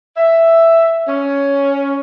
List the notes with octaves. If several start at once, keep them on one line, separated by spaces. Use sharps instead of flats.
E5
C#4